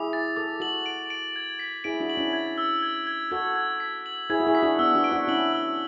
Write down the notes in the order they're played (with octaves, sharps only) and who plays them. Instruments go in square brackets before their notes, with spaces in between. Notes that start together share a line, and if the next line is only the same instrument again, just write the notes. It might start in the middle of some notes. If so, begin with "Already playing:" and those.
Already playing: [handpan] E4 G#4 [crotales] D6
[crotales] A6
[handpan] A4 [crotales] D6
[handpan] F#4 A4 [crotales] F#7
[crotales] D7
D7
G#6
B6
[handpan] E4 G#4 [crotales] D7
[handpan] D4 F#4
[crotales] F#7
[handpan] C#4 E4
[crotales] G#6
E6
G#6
G#6
[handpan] F#4 A4 [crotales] G#6
[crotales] G#6
B6
F#7
[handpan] E4 G#4 [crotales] G#6
[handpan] F#4
E4 G#4
[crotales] B6
[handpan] D4 F#4
[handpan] B3 D4 [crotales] E6
[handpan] D4 F#4
[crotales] D7
[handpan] D4 F#4
[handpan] C#4 E4 [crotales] F#7
[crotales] E6